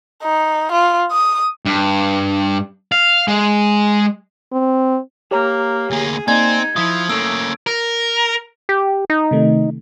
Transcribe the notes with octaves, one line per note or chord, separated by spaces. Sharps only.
D#4
F4
D#6
G2
F5
G#3
C4
A#3 G4 C#5 A#5
D2 A#3 G#4
A#3 C4 D#4 D5 G#5 G#6
F3 E4 F4 D#6
A3 A#3 C#4 E6 D7
A#4
G4
D#4
C3 D#3 A3